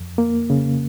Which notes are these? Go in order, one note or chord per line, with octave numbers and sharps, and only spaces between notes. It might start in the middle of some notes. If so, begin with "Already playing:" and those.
Already playing: F2
A#3
C#3